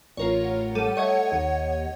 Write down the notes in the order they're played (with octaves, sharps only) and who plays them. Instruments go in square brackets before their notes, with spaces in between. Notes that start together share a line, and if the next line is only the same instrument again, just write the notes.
[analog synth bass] A1 [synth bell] F4 A#4 C#5
[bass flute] F#5
[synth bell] G3 A4 D#7
[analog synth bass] A3 [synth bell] C#5 D#5 G#6
[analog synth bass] D#2